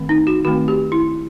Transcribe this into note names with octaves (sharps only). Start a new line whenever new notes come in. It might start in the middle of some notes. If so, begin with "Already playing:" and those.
Already playing: D#3 A3 C4
D#4
F#4
D#3 A3 C4 F#4
G4
E4